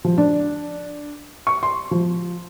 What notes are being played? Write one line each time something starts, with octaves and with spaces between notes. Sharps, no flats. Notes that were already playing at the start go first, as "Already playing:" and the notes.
F3
D4
C#6
C6
F3